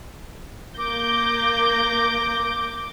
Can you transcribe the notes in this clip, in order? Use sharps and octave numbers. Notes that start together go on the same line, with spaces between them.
A#3 D6 G6 A#6